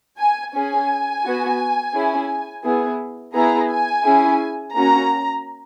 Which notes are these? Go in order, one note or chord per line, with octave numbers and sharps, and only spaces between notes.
G#5
C#4 G#4 G#5
B3 F#4
C#4 E4 G#4
B3 E4 G#4
B3 E4 G#4 A#5
G#5
C#4 E4 G#4
A#3 C#4 F#4 A#5